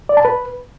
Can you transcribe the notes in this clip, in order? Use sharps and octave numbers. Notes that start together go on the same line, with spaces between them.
D5
A5
B4